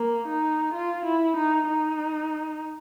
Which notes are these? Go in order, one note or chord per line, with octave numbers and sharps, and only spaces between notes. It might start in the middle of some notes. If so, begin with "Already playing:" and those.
Already playing: A#3
D#4
F4
E4
D#4
D#4